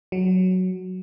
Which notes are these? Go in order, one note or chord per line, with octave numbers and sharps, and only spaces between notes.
F#3